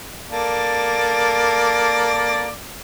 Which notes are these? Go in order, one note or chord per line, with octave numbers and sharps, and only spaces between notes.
A#3 A4 D5